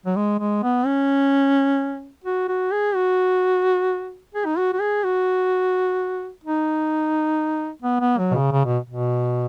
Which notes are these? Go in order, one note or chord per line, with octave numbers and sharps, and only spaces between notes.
F#3
G#3
G#3
B3
C#4
F#4
F#4
G#4
F#4
G#4
D#4
F#4
F#4
G#4
F#4
D#4
B3
B3
F#3
B2
C#3
C#3
B2
B2